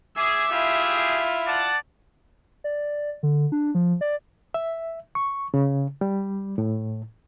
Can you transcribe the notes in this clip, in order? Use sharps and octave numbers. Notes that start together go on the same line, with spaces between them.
G#4 E5 D6
E4 F4 G4 G#4
D5 F#5 A5
D5
D3
D4
F3
D5
E5
C#6
C#3
G3
A2